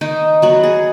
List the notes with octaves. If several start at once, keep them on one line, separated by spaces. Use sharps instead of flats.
D#3 D#4
F#3 B3 F#4
G#4